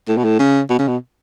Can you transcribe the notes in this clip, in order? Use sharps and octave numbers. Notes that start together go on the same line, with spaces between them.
A2
B2
A2
C#3
B2
C#3
B2